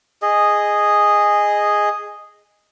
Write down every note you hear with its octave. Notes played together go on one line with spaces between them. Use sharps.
G#4 D#5